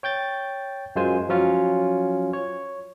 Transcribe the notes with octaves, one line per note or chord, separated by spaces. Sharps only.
C#5 G5 G6 A6
F#2 G#3 F4 C5 G#5
F3 F#3 C#4 F4
C#5